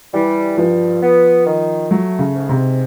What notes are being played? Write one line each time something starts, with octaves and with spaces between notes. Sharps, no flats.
E3 G3
G2 F3
B3
D#3
F#3 A3
C#3
G#2
C3